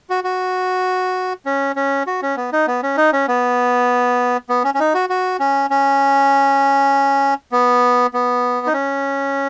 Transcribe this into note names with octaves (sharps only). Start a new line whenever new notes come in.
F#4
F#4
C#4
C#4
F#4
C#4
B3
D#4
B3
C#4
D#4
C#4
B3
B3
C#4
C#4
D#4
F#4
F#4
C#4
C#4
B3
B3
D#4
C#4